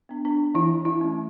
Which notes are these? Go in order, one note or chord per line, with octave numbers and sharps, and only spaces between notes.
B3 D4
D4
E3 E4
E4
A3 C#4